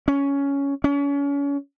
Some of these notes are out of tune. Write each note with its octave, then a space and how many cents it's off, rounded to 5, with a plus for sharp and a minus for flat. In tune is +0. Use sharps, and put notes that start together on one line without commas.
C#4 +10
C#4 +35